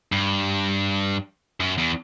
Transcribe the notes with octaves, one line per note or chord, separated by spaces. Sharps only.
G2
F#2
E2